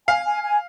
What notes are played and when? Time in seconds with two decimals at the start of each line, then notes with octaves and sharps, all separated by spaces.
0.08 F5 G#5
0.26 G#5
0.43 G#5